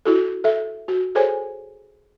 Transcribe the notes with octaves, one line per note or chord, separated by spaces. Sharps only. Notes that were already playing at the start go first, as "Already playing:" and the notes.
E4 F#4 A4
A4 E5
F#4
G#4 A4 C5 C#5 G#5